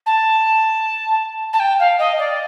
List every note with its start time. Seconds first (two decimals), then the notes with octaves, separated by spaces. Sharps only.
0.06 A5
1.53 A5
1.60 G5
1.79 F5
1.99 D#5
2.18 D5